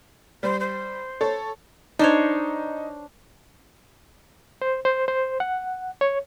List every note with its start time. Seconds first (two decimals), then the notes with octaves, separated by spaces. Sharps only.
0.43 G3 C5
0.60 C5
1.21 A4 C#5
1.99 D4 D#4 C5 C#5
4.62 C5
4.85 C5
5.08 C5
5.40 F#5
6.01 C#5